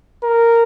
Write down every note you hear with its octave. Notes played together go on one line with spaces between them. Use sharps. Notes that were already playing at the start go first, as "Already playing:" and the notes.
A#4